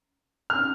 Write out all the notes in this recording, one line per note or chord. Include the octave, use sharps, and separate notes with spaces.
F6